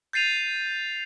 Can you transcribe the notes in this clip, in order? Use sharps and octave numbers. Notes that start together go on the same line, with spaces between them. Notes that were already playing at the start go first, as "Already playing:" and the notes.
G6 A6 C7 D#7 F7